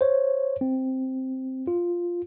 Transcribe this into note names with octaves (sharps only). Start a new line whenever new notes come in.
C5 C#5
C4
F4